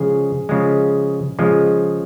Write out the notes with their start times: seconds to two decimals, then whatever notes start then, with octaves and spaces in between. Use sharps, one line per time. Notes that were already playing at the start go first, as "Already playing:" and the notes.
Already playing: C#3 F3 G#3 G#4
0.49 C#3 F3 G#3
1.39 C#3 F3 G#3